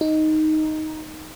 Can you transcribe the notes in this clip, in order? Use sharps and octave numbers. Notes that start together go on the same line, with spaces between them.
D#4